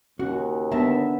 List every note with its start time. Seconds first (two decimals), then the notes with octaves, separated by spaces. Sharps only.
0.19 D#2 C#4 F#4
0.72 D3 B3 A#4 E5 A5